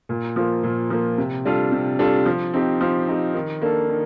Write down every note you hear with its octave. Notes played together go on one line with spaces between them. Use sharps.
A#2
F3 A#3
A#2
F3 A#3
C3
G3 D4 F4 A4
C3
G3 D4 F4 A4
F3
C4 D#4 G4
F3
C4 D#4 G4
D#3
A#3 D4 A4
D#3